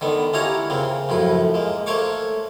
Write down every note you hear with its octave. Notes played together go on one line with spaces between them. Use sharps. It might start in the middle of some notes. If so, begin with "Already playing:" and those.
D3 D#3 B3
C#4 E4 F4 G4 C#5 A#5
C#3 A#3 C4
F#2 A2 F3 B4
G#3 A#3
A3 A#3 C5 C#5 C#6 D6